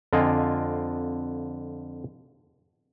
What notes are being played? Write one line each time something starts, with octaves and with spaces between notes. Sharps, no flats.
F2 D3 F4 D5 D#5 G#5